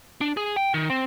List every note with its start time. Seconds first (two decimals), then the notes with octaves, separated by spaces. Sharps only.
0.21 D4
0.37 G#4
0.56 G5
0.74 D#3
0.90 C4